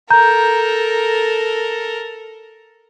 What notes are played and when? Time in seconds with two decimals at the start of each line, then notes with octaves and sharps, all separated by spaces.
0.10 A4 A#4 A#5 G6